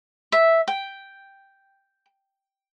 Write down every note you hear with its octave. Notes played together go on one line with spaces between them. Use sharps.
E5
G5